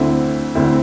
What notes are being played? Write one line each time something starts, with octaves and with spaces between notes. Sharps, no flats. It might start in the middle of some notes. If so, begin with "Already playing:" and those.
Already playing: D2 D3 C4 E4
D2 D3 C4 E4